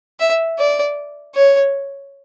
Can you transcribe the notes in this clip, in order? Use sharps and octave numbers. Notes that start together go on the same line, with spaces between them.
E5
D5
C#5